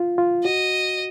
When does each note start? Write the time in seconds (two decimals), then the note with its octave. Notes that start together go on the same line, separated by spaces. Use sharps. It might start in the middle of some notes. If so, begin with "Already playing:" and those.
Already playing: F4
0.18 F4
0.44 F#4 D#5